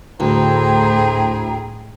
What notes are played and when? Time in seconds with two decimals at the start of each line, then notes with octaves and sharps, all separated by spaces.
0.20 D2 A2 E4 G#4 C5 G5 A#5